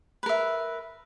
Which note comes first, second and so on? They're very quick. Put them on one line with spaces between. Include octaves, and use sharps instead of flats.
B4 A#4 E5